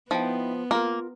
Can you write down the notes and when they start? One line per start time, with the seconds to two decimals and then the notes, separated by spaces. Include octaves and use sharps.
0.11 F3 B3 D#4 E4 G5
0.71 A#3 F4 A#4